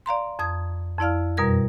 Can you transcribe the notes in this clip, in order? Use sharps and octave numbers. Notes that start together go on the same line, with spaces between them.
D5 F5 A#5 C6
F2 D#6 G#6
F2 E4 D5 F5 F6
F#2 B2 G3 A#4 G#6